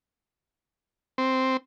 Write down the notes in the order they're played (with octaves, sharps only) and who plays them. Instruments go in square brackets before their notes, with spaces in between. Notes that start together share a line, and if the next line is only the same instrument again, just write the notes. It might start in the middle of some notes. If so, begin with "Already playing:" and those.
[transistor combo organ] C4